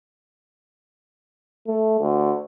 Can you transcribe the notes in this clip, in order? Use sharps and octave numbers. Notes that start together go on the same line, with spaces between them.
A3
D2